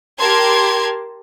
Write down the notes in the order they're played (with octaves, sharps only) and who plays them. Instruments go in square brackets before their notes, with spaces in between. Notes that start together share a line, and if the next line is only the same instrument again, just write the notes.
[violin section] G4 A#4 A5 C6 G#6